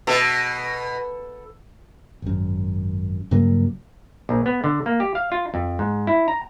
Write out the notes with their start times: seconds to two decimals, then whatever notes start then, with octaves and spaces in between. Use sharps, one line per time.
0.07 B2 A4
2.22 G#1 F#2
3.31 G2 C#3 F#3 A#3
4.29 A#1
4.46 B3
4.64 D3
4.86 A#3
5.00 G4
5.15 F5
5.32 F4
5.54 F2
5.79 G#2
6.07 E4
6.28 A#5